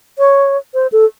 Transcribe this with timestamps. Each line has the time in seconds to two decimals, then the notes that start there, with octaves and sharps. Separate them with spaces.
0.19 C#5
0.74 C5
0.92 A4